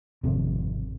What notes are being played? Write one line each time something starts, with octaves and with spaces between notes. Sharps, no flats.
G#1 F2 C3